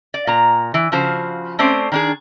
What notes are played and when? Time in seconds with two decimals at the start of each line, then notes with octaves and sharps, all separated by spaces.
0.14 D5
0.27 A#2 A#5
0.74 E3
0.92 C#3 F3 F#4 C5
1.59 A3 C4 C#4 C5 D5
1.92 D#3 D4 G#4